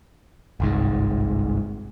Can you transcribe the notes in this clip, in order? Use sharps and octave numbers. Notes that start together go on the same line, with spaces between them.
G1 C2 G#2